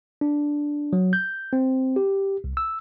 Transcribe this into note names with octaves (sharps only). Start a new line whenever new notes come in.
D4
F#3
G6
C4
G4
C2
E6